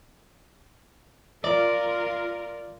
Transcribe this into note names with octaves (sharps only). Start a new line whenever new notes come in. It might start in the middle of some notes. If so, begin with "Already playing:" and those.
F4 A#4 D5